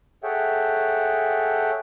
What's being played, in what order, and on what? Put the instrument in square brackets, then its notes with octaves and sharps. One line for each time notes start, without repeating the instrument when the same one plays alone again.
[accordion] G#4 A4 C#5 E5 F#5 G5